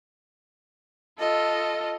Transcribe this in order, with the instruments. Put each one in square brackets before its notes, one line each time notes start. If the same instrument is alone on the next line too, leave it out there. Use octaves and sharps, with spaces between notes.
[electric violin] F4 A4 [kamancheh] D#5